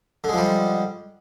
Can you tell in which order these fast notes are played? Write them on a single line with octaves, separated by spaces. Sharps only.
D3 G#3 F3 G3